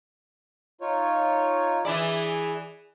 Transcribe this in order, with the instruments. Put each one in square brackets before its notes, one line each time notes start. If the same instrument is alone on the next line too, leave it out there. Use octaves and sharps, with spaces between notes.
[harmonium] D#4 F4 C#5
[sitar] E3 E4 D5 [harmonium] G#4